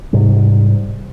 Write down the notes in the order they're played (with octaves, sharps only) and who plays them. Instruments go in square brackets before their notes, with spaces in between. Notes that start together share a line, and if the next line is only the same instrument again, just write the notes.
[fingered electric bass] G#2 C3 G3